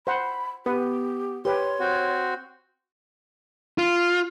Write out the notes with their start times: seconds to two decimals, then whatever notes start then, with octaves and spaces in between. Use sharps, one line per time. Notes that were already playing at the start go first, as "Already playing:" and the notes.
0.07 C5 F#5 B5
0.66 B3 G4 B4
1.45 G4 B4 C#5 C6
1.80 C4 F#4
3.78 F4